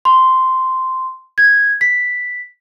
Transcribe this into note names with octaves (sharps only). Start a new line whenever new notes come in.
C6
G#6
B6